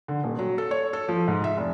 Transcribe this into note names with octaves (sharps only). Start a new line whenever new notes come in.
D3
D#1
F#3
A4
C#5
A4
F3
G#2
E5
F1